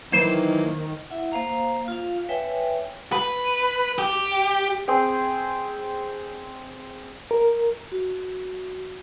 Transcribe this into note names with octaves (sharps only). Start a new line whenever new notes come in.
D#3 E3 F#3 A#3 C5
E4 E5 F#5
A#3 C5 F5 A#5
F4 F5
B4 C#5 E5 G5 G#5
B4
G4
C4 G#4 G5
A#4
F#4